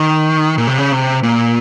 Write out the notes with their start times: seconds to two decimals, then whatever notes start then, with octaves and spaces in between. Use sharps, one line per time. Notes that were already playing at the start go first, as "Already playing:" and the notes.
Already playing: D#3
0.58 A#2
0.67 C3
0.78 C#3
0.92 C3
1.23 A#2